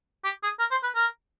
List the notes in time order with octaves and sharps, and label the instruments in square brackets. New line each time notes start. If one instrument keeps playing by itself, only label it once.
[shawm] G4
G#4
A#4
C5
B4
A#4